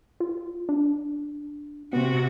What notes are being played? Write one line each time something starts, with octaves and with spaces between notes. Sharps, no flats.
F4
D4
C3 B3 F#4